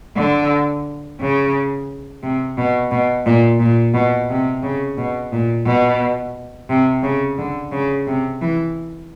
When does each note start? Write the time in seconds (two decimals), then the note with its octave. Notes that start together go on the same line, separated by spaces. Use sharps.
0.17 D3
1.20 C#3
2.23 C3
2.57 B2
2.91 B2
3.26 A#2
3.60 A#2
3.94 B2
4.29 C3
4.63 C#3
4.98 B2
5.32 A#2
5.66 B2
6.70 C3
7.03 C#3
7.38 D3
7.72 C#3
8.07 C3
8.41 E3